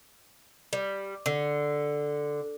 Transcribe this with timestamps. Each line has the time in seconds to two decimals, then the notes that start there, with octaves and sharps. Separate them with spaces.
0.73 G3
1.26 D3